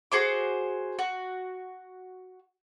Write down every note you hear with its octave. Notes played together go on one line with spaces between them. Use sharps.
F#4 G#4 C5 D6
F#4